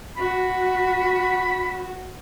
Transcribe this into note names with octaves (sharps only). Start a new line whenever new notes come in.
F#4 B5